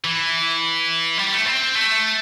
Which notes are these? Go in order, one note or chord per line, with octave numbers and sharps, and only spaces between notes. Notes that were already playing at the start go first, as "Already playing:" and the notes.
E3
G3
A3
C4
A3